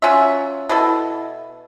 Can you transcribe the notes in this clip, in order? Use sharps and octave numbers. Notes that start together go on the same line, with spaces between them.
F#3 C#4 F4 E5
B2 E4 A4